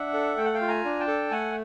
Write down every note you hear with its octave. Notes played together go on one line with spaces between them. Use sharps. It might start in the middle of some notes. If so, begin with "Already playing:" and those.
Already playing: D4 E5 F#5
A4
A3 G5
F#5
F5 G5
F4
G#5 A#5
D4
G5 A5
A4
A3 F#5 G#5